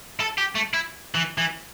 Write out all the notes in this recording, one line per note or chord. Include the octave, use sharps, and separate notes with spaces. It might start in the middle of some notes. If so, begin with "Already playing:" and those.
A4
G4
A3
E4
E3
E3